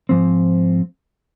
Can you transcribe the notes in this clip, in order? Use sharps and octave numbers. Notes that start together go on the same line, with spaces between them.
G#2 F3 C4